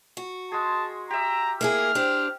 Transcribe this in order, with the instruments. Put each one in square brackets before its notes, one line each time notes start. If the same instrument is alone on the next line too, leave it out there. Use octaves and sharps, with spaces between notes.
[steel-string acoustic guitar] F#4
[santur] G#3 G#4 [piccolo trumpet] A5
[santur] G4 E5 [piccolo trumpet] A#5
[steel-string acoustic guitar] A#3 E4 G#4 [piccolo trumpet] F6
[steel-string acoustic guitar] D4 G4 C5